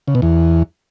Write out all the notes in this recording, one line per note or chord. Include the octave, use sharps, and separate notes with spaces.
C#3
B2
E2